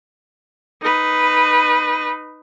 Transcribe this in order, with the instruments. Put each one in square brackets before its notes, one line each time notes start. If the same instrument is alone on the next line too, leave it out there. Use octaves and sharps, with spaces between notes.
[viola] D#4 B4